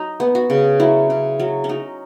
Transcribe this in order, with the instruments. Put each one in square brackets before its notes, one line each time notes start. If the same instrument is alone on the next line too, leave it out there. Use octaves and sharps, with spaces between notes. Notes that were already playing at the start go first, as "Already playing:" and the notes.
Already playing: [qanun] F#3 D#4
B3
F#4
C#3
F#3 E4
C#3
F#3
C#4
F#3 D#4